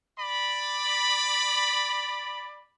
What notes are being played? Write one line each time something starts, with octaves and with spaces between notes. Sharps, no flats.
D5 B5